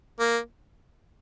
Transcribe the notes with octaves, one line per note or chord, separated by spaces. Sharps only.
A#3